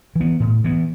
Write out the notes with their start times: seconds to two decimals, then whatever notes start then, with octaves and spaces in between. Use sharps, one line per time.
0.15 E3
0.21 B3
0.40 A2
0.64 E3 B3